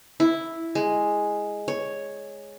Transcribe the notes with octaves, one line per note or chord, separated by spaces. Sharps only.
E4
G#3
C#5